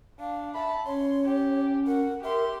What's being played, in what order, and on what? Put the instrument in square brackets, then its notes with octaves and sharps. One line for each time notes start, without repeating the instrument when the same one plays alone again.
[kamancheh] D4 [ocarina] F5
[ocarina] E5 [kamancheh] A5 B5
[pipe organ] C#4 [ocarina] C#5 [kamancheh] C6
[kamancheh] G4
[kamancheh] F#4 [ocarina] A#4
[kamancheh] G4 C6 [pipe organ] A#4 [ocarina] E5